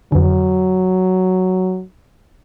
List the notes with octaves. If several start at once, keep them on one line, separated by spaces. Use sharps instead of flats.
F2 D3 F#3